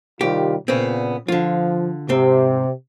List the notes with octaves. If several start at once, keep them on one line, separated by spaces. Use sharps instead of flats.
C2 D#3 G3 F4 G4
A#2 C#3 B3 C4
D3 F3 F4
G#2 C3 C4